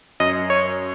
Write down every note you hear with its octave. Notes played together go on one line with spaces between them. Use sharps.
F#2 D#5
C#5